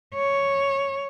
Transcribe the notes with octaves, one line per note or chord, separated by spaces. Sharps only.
C#5